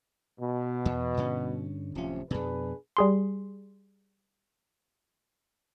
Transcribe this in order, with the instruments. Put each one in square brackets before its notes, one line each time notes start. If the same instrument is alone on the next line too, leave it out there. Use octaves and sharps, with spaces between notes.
[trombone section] B2
[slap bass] E2
G2 D3 C#4
[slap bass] D1 C#4 [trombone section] C3 F3
[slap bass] F2 B2 [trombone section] D4 G#4 B4
[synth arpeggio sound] G3 G#4 C6